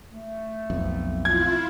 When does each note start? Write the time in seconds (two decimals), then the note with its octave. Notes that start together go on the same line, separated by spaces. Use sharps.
0.10 A3
0.70 B1 F2
1.25 E4 F4 G#6